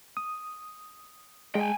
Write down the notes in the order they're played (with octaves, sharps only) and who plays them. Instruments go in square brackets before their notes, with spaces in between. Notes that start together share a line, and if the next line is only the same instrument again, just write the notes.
[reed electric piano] D#6
[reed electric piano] G#3 [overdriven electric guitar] G5 G#5